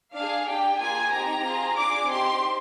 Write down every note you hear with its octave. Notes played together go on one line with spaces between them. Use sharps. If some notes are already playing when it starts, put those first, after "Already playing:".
D4 G#4 F5
D4 G4 G5
A#3 F4 G#4 G#5
C4 D#4 G4 A#5
C4 F4 G#4
D4 G#4 D6
C4 D#4 G4 C6